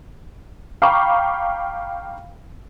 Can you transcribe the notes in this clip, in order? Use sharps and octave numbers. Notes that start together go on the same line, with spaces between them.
F5 G5 A#5 B5 C#6 D6